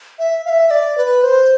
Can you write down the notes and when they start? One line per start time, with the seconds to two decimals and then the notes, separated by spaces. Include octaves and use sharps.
0.19 E5
0.46 F5
0.50 E5
0.71 D5
0.98 B4
1.23 C5